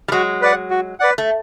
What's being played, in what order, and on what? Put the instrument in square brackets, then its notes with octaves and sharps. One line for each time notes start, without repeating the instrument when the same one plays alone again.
[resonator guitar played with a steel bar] G3
[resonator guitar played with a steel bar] F#3 G#3 [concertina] F#4
[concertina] B4 D5 F#5
F#4
B4 D5 F#5
[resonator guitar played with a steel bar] A3